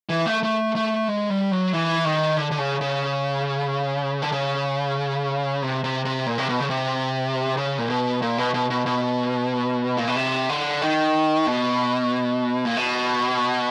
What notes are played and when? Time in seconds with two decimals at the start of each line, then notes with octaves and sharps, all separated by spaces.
0.09 E3
0.26 A3
0.43 A3
0.75 A3
1.08 G#3
1.30 G3
1.51 F#3
1.73 E3
2.05 D#3
2.37 D3
2.51 D3
2.58 C#3
2.81 C#3
4.22 D3
4.32 C#3
5.62 C3
5.84 C3
6.05 C3
6.27 A#2
6.38 C3
6.49 B2
6.60 C#3
6.70 C3
7.57 C#3
7.78 A#2
7.90 B2
8.22 A#2
8.38 B2
8.54 B2
8.70 B2
8.86 B2
9.97 A#2
10.07 B2
10.16 C3
10.49 D3
10.81 D#3
11.47 B2
12.65 A#2
12.77 B2